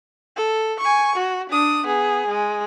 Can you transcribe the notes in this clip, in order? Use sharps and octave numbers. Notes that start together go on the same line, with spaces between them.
A4
G#5 C#6
F#4
D4 D#6
B3 G#4
G#3